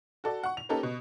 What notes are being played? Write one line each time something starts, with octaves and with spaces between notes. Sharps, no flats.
F#4 A4 D5
F#5 C#6
F7
A#3 C#4 D#4 G4 A4 B4
B2